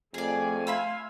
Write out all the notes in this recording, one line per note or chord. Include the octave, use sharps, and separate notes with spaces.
F2 A3 G#4 D5 G#5
E5 F5 B5 C6 E6